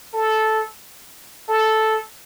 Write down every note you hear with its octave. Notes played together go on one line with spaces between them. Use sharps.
A4
A4